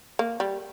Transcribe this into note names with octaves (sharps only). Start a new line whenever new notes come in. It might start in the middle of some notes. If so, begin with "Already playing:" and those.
A#3
G3